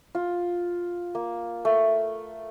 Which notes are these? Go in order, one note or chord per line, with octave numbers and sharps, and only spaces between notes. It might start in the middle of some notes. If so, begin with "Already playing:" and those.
F4
A#3
A3